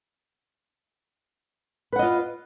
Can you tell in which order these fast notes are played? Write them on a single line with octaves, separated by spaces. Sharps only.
B4 F#5 D#5 F4